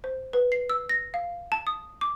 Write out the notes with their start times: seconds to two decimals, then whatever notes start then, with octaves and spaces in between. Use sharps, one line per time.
0.04 C5
0.33 B4
0.52 C7
0.70 E6
0.89 A#6
1.14 F5
1.52 A5
1.67 D#6
2.01 D6